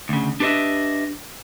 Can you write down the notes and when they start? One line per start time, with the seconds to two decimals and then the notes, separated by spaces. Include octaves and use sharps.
0.09 D2 C#3
0.40 D4 G4 B4 C5 D#5 E5